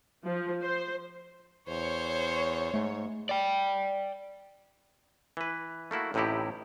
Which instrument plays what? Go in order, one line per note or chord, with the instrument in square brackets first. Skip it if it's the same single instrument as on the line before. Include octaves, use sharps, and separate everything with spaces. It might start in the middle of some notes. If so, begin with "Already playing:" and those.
[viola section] F3
C5
[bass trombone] E2 [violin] C5 [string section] C#5
[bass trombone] G#2 [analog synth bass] A3
[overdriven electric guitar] D5 G5
[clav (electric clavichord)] E3 B4
A3 A#3 E4 F#4
A1 A2 C3 D#4 E4 G4